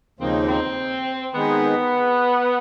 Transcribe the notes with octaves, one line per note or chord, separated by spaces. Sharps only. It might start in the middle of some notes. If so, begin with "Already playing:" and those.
D#2 C#3 F3 A#3 C4 D#4
C4
D#3 G#3 B3 C4 D#4 G#4